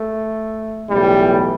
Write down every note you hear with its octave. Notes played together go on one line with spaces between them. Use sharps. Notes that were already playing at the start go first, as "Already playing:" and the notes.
Already playing: A3
B1 A2 E3 G3